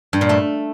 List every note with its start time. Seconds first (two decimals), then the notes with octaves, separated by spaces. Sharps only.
0.13 G2
0.21 A#2
0.29 A3